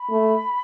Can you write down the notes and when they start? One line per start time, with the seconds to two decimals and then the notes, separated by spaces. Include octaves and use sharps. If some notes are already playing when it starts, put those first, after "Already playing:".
Already playing: B5
0.10 A3